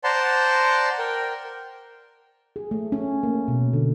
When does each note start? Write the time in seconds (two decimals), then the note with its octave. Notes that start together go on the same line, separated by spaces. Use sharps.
0.04 C5 D5 F#5 A5 A#5 C6
0.99 A#4 G5
2.56 G#4
2.71 A3
2.92 C#4
3.23 A#3
3.48 B2
3.73 D3